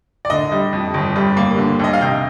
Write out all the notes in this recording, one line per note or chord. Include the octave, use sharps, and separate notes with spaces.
D5
D3 D#5
G3
F2
G1
G3
A#3
D3
D#2 D#5
F5
C3 G5